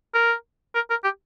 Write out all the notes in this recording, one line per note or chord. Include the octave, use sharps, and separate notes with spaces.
A#4
A#4
A#4
G4